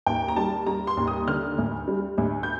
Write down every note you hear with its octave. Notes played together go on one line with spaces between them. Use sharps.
D#2 G5
A#5
G3 A5
G3 A#5
C6
D#2
D#6
D3 F6
D2
G3
D2
G6